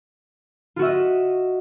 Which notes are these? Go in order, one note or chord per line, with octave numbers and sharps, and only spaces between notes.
F4 F#4 D#5 E5